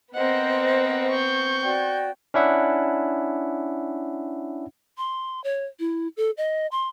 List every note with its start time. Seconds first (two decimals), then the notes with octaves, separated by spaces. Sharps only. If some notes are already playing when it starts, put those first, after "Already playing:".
0.14 B3 C4 A#4 C5 D#5 F#5
1.11 C#6 G6
1.62 F#4 D5 G5
2.34 C#4 D4 E4 E5 F#5
4.98 C6
5.44 C#5
5.80 E4
6.17 A4
6.37 D#5
6.72 C6